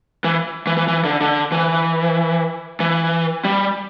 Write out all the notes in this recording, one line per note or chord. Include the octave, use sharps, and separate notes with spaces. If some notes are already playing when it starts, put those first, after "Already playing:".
E3
E3
E3
E3
D3
D3
E3
E3
G3